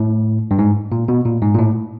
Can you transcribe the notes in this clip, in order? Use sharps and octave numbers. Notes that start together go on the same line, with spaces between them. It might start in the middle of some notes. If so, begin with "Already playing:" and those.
Already playing: A2
G2
G#2
A#2
B2
A#2
G#2
A#2
A2